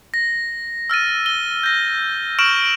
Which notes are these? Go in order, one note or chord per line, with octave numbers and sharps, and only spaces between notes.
A#6
E6 F6 A6 D#7
G7
G6 A#6
C#6 F6 D7 E7 F#7